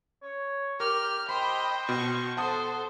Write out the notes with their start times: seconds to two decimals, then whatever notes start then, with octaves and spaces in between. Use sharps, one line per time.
0.23 C#5
0.80 G4 A#4 F6
1.29 C5 D#5 G5 B5
1.89 B2 C#6
2.37 A4 C5 F#5 A5 D#6